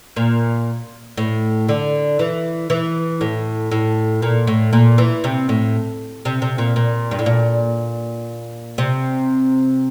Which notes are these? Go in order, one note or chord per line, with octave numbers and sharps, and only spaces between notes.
A#2
A2
D3
E3
E3
A2
A2
A#2
A2
A#2
E3
C3
A2
C3
C3
A#2
A#2
G2
A2
A#2
C3